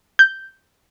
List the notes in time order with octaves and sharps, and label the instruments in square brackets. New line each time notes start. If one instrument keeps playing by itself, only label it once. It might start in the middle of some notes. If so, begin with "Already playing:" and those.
[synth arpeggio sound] G6